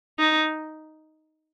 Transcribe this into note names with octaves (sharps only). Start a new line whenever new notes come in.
D#4